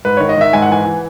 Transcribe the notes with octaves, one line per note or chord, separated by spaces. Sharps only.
G#2 B4
D#3 C#5
D#5
D#3 E5
G#2 G#5
F#5
E3 G#5
E3